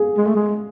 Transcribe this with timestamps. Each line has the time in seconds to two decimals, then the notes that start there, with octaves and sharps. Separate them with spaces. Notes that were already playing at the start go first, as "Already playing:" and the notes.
Already playing: G#4
0.18 G#3
0.27 A3
0.36 G#3